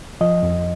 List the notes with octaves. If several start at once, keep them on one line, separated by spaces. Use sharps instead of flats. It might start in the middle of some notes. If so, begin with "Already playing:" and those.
F3 D#5
F2